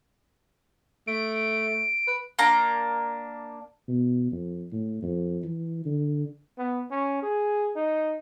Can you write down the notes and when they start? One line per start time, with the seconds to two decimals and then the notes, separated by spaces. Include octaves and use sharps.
1.07 A3 D7
2.07 B4
2.39 A#3 D4 A#5
3.88 B2
4.32 F2
4.72 A2
5.02 F2
5.44 E3
5.86 D3
6.58 B3
6.91 C#4
7.23 G#4
7.76 D#4